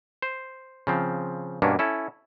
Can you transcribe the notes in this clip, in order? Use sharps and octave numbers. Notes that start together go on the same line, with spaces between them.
C5
C#3 F3 C4
G2 B2 A#3 C#4 D4
C#4 E4 A4